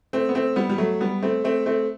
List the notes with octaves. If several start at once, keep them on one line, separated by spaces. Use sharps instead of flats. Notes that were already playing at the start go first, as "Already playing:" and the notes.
A3 C4
B3
A3 C4
G3 B3
G3
F#3 A3
G3 B3
A3 C4
A3 C4
A3 C4